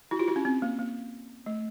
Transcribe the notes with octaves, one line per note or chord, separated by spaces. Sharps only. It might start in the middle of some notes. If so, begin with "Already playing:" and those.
E4 F#4
F4 G4
E4 F#4
C#4
C4
A#3
A#3
A3